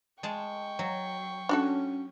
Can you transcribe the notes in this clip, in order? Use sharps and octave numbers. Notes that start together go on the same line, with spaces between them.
G#3 G5 A5 C#6
F#3
C#4 D4 F#4 A4